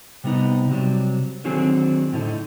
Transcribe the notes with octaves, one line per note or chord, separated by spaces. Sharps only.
C3 G3 B3 D#4
C3 F#3 G3
D3 D#3 F#3 C4 G#4
A2 D3 D#4